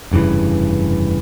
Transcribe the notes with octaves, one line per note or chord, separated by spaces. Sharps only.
F1 G2 C#3 E3